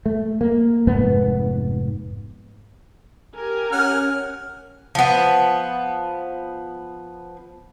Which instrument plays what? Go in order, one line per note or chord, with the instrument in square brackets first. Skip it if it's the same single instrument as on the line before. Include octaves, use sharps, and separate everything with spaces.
[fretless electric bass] A3
A#3
F1 G#2 B3
[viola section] G4 A#4 G#5
[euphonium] C#4 [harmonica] F#5 F6
[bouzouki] F3 B3